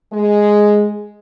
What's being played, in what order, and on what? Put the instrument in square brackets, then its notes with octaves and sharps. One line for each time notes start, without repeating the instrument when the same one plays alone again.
[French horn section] G#3